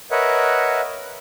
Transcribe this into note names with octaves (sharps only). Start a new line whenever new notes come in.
A#4 B4 C#5 D#5 E5 F#5